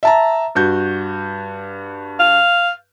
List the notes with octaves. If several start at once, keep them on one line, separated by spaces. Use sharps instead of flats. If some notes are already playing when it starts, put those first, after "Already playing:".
E5 A5 A#5
G2 F#4 G6
F5